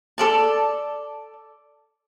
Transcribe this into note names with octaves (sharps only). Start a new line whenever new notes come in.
A4 D5 A5